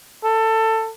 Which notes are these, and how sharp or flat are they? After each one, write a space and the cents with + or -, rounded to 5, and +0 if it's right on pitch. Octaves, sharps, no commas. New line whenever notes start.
A4 +20